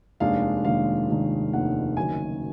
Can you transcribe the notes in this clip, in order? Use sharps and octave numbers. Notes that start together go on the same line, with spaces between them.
F1 D#2 D#3 G#3 D4 F5
F1 D#2 D#3 G#3 D4 F5
F1 D#2 D#3 G#3 D4
F1 D#2 D#3 G#3 D4 F#5
F#1 F#2 D#3 F#3 G#5